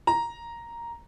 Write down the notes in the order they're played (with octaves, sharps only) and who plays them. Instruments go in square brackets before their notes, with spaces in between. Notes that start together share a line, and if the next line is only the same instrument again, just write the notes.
[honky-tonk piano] A#5